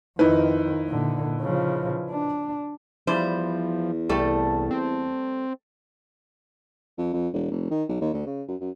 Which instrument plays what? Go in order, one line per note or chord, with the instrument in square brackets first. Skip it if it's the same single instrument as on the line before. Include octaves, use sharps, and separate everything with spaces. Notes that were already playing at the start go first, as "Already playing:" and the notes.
[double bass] F2 D#3 [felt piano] D#4 E4 B4
[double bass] A#2 D3
C#3 F3
D4
[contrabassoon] E2 [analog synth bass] F3 [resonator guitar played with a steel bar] G3 E4 C5
[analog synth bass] C2 [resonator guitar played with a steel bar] G3 A3 A4
[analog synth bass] C4
[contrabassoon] F2
F2
E1
F1
D#3
B1
D#2
D2
C#3
F#2
F#2